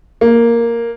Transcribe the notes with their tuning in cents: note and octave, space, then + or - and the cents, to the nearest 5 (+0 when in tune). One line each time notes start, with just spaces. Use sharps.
A#3 +0